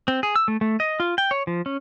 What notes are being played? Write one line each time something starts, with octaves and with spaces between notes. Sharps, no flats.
C4
G#4
E6
A3
A3
D#5
F4
G5
C#5
F3
C#4